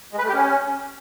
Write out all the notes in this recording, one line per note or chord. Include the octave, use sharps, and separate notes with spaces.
G#3
B4
A3
G4
C#4